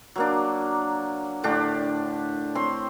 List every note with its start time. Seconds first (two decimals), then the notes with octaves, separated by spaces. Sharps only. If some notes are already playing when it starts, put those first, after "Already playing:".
0.16 F#3 A#3 D4
1.43 A2 D3 D4 G4
2.55 C4 C#5 C6